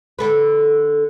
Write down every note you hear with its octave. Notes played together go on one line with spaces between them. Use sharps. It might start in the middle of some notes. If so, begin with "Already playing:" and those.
D3 A4 B4